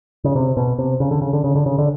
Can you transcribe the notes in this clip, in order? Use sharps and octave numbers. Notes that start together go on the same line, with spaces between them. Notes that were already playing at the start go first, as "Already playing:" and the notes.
C#3
C3
B2
C3
C#3
D3
C#3
D3
C#3
D3
C#3
D3